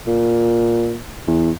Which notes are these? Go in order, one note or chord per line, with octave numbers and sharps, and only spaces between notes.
A#2
E2